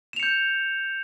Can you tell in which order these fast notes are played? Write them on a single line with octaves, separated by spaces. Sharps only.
E7 F7 C#7 G6